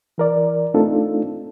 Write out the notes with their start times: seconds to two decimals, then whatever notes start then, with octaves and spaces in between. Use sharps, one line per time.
0.18 E3 A#4 D5
0.74 A3 C4 D4 D#4 F4 A4